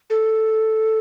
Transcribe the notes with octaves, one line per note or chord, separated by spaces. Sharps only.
A4